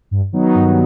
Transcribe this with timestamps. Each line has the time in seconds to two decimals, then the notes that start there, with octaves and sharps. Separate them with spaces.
0.11 G2
0.32 D#3 F#3 B3 D#4
0.55 G2